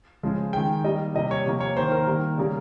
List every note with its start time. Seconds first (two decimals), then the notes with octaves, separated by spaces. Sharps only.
0.23 C#3 F3 G#3
0.53 D#3 G#3 G5
0.84 D#3 G3 A#3 D#5
1.14 C3 G3 A#3 D#5
1.31 C#5
1.46 C3 F3 A#3
1.60 C#5
1.77 D#3 A#3 C5
1.92 A#4
2.07 D#3 G3 A#3
2.38 C#3 G3 A#3